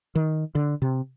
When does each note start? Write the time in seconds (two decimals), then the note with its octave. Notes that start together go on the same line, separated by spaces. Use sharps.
0.15 D#3
0.55 D3
0.82 C3